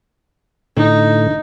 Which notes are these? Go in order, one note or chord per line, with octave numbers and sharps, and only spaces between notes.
A2 D3 D#4